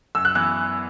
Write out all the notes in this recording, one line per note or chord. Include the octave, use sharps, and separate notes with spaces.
F#2 E6
F#6
E3 B3 F#6